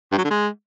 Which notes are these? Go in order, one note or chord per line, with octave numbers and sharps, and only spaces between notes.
G2
F#3
D3
G#3